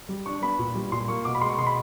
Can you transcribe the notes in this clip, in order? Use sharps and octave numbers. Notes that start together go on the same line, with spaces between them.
G3
D4 C#6
B3 B5
A#2
G3
A#2 C6
A#3 C#6
B2 D6
B5
G#3 C6
C#6
B2 C6
B5